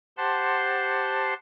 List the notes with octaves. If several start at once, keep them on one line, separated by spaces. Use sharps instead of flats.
G4 C5 F#5 A5 C6